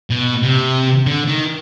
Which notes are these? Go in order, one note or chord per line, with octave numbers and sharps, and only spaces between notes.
B2
C3
D3
D#3